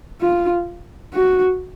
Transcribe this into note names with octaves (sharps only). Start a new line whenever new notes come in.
F4
F#4